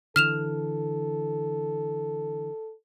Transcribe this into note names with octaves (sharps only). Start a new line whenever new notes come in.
D3 E3 A4 F6 E7 F7